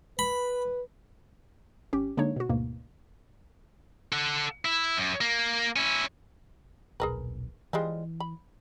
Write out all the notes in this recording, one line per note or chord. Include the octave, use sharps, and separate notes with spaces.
B4 B5
G#1 C#4 G4
D3 G#3 A#3 D4 D#4 C#5
B2 F#4
D2 G#2 B2 A#3
A4 F#5
E4
F#2
A#3
C#4 E4
D#1 B1 G#4 A#4 B4
E3 F3 G3 G#3
B5